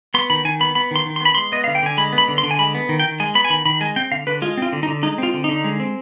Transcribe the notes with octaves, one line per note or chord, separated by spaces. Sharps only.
B3 C6
D#3 B5
D#3 G#5
B3 B5
B3 B5
D#3 C6
D#3
C6
B3 B5
G#3 C6
B3 D#5
D3 F5
G5
D3 G#5
G#3 B5
B3
B5
D3
C6
D3
G#5
G#3 B5
B3
D#3
G5
D#3
G#3 G#5
B3 B5
G#5
D#3 B5
D#3 B5
G#3 G#5
C4 G5
D3 F5
D3 B4
G#3 F4
C4 F4
D3
D#4
D3
G#3 D#4
C4 F4
D3
D3 D#4
G#3
C4